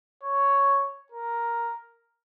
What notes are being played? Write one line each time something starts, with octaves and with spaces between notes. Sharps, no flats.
C#5
A#4